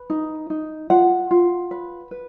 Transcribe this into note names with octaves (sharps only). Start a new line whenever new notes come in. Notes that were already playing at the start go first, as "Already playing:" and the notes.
Already playing: B4
D#4
D#4
F4 F#5
F4
B4
B4